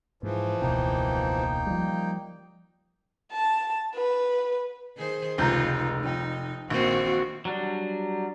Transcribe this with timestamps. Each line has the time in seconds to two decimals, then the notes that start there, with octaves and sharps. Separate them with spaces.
0.23 G#2 E3 F3
0.62 E1 C#2 B2 A#3 D#4 G5
1.67 F3 G3
3.32 A5
3.95 B4
4.97 D#3 G#4 C5
5.38 F1 C#2 G#3 D#4 F4 A#5 G6
6.04 F3 D#4 G5
6.70 A#1 D#3 A#3 C4 F#4
7.45 F#3 G3 D4